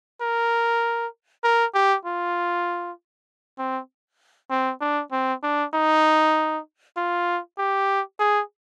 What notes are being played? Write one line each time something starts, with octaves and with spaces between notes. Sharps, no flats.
A#4
A#4
G4
F4
C4
C4
D4
C4
D4
D#4
F4
G4
G#4